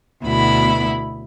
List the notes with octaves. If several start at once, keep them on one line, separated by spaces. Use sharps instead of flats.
D2 B2 B3 E4 B5